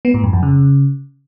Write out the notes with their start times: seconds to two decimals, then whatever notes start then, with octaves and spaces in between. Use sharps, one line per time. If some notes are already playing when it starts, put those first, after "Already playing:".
0.05 B3
0.14 A2
0.24 F#2
0.33 F2
0.43 C#3